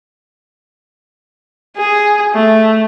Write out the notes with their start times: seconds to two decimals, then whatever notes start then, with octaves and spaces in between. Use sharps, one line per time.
1.76 G#4
2.33 A3